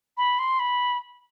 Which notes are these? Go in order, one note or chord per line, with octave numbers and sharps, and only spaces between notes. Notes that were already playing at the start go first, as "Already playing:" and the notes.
B5
C6
B5